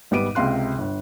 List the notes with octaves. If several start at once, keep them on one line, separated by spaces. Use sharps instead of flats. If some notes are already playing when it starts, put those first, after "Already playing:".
G#1 G3 B3 D6 D7 D#7
C#2 C3 F5 C6 F#6
G1